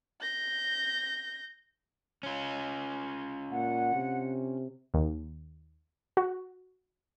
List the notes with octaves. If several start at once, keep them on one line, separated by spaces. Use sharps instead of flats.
G6 A#6
C#4 F4
A#2 F#5
C3
D#2
F#4